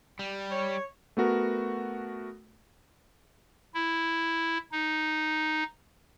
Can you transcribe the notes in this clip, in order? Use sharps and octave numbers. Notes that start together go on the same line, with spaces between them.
G3
C#5
A3 B3 F#4 A#4
E4
D#4